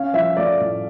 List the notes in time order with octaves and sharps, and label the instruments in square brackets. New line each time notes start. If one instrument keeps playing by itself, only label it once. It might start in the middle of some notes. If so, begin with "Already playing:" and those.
Already playing: [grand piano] C#4 F5
F3 E5
A3 D5
A2